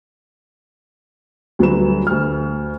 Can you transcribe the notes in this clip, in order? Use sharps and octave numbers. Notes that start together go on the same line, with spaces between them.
D2 F#3 G3 A3 B4 E7
D2 F6